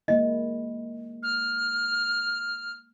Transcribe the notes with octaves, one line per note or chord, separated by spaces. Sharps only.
G#3 A#3 E4 D#5
F6